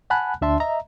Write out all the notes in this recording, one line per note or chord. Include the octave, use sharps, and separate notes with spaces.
F#5 G#5 A5 B5 F#6
D2 D4 E5 A5 C6
D#5 E5 A#5